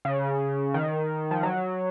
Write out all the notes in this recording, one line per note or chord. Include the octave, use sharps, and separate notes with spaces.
C#3
D#3
F3
F#3